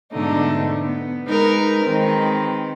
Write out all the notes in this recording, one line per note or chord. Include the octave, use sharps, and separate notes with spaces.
G#2 B2 D3 A3 D4 D#4
B3
G#3 D#4 A#4 B4
D#3 G#3 C4 B4